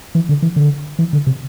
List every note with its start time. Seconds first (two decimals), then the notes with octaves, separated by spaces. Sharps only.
0.15 E3
0.29 D3
0.42 E3
0.56 D3
0.99 E3
1.13 D3
1.27 C3